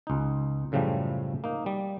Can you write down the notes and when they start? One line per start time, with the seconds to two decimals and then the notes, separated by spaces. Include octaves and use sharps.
0.07 C#2 D#4
0.72 F#2 A2 C#3 F3 G3 A3
1.44 A#3 D#4
1.66 G3